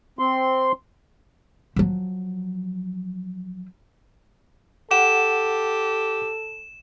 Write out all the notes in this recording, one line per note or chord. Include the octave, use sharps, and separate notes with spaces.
C4 C6
F3 F#3
G4 A4 F#5 E7